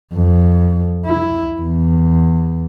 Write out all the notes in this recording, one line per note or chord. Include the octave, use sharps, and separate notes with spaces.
F2
E4
E2